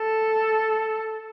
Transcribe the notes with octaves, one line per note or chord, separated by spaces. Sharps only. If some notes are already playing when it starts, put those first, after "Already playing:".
Already playing: A4